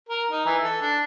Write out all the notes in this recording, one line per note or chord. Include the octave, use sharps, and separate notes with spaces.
A#4
D#4
E3
A4
D4